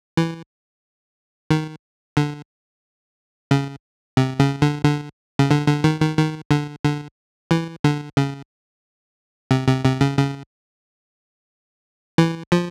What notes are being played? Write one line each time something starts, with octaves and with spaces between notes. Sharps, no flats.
E3
D#3
D3
C#3
C3
C#3
D3
D3
C#3
D3
D3
D#3
D#3
D#3
D3
D3
E3
D3
C#3
C3
C3
C3
C#3
C#3
E3
F3